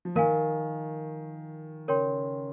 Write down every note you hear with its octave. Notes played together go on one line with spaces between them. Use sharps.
F3
D#3 A#4 F5 G#5
C#3 A#4 C#5 G5 C6